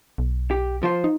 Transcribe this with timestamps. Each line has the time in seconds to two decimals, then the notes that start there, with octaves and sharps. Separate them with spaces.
0.18 B1
0.51 G4
0.83 F3 F4 C5
1.04 D#4